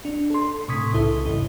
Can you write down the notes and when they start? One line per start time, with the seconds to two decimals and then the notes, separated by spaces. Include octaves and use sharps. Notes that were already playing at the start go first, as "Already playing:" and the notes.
0.05 D4
0.30 A4 C6
0.68 A2 C3 C#6 D#6 G#6 B6
0.93 C2 C#3 E4 A4 D#6
1.26 A#1 E2 G#2 E4